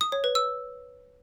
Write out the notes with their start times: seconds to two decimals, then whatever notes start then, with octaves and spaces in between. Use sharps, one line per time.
0.01 D#6
0.12 C#5
0.24 B4
0.35 E6